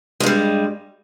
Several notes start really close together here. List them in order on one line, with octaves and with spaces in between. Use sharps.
G#3 G2 G3